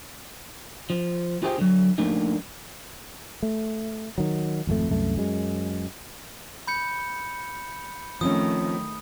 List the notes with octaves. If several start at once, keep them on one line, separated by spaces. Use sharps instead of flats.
F3
F4 G4 G#4 C5 D5 G5
D3 F#3
F3 A3 A#3 D4 D#4
A3
D#3 F#3
G#1 F2 C3 A3
C2 F#2 A3
F#2 G#3
B5 G6 C#7
D#3 F3 A3 C4 C#4 D#6